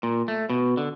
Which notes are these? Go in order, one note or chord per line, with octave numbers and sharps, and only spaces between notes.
A#2
A3
B2
D3